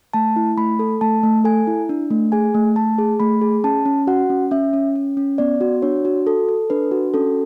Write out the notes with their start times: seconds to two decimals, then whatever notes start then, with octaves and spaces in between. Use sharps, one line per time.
0.14 A3 A5
0.36 E4
0.57 A3 B5
0.79 A4
1.01 A3 A5
1.23 A3
1.44 A4 G#5
1.67 E4
1.89 D4
2.11 A3
2.32 G#4 G#5
2.54 A3
2.76 A3 A5
2.98 G#4
3.20 A3 B5
3.41 G#4
3.64 C#4 A5
3.85 C#4
4.07 F#4 F#5
4.30 C#4
4.51 C#4 E5
4.73 C#4
4.96 C#4
5.17 C#4
5.38 B3 D5
5.61 F#4
5.82 D4 C#5
6.05 F#4
6.27 A4
6.49 A4
6.70 D4 B4
6.91 F#4
7.14 C#4 A4